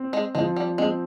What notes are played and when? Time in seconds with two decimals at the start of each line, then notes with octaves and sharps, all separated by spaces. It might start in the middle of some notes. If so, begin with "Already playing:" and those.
Already playing: C4
0.13 G#3
0.35 F3 G#3
0.56 G3
0.78 G#3 C4